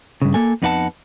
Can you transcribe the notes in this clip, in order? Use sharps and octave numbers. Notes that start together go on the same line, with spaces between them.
G2 C#3
A#3 A4 G#5
F2 B3 D#4 B4 F#5 A5